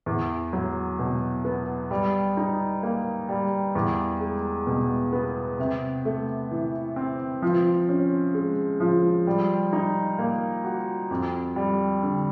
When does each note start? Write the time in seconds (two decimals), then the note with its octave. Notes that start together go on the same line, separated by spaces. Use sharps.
0.06 E2
0.53 F#3
0.99 B2
1.45 B3
1.91 G3
2.37 D#4
2.83 A#3
3.29 G3
3.75 E2
4.20 G#3
4.67 B2
5.13 B3
5.59 C3
6.05 A3
6.51 E3
6.96 C4
7.42 F3
7.89 C#4
8.34 G#3
8.80 F3
9.27 G3
9.73 D#4
10.19 A#3
10.64 F#4
11.11 F2
11.56 G3
12.03 D3